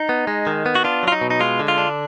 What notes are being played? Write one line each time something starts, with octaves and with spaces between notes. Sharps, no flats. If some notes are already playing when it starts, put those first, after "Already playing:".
Already playing: D#4
B3
G#3
D#3
B3
F#4
D4 F4
F#3 F4
D#4
B2
D#4
G#3 F4
D3
F4
D4